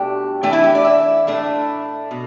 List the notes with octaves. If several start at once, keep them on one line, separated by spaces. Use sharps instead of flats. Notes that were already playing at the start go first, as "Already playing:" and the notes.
Already playing: B2 A3 D4 G4
E3 A3 D4 G5
E4
G4
D5
E5
A2 A3 D4
B2